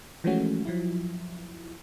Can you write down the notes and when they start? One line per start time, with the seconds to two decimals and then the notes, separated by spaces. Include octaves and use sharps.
0.24 E3 F3 G#3 A3 C#4 F#4
0.65 F3 F#3 E4